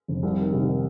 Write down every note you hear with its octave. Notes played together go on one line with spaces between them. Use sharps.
F1
C2
D#3
C3
D#3